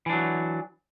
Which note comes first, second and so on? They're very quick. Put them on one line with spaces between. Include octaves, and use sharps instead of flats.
E3 D4 F#3